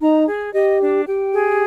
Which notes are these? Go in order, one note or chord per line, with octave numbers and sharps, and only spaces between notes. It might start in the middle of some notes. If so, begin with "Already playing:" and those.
D#4 A#5
G#4
G4 D#5
D4
G4 G5
G#4